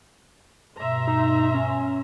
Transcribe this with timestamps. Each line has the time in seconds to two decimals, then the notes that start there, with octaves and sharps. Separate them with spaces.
0.77 G2 B2 E5 A#5 C6
1.07 D#4
1.54 C#4